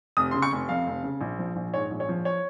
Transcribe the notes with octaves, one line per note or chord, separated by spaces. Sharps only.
F1 D#6
C#3 C6
C#6
F1
F2 F5
F1
C#3
A#1
F3
A#1
G#2 C#5
A#1
C#5
F3
C#5